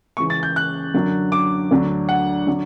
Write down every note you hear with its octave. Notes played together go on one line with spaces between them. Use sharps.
C#2 C#3 E3 C#6
A6
G6
F#6
F#2 D3 F#3
D6
D2 D3 F#3
F#5
D3 F#3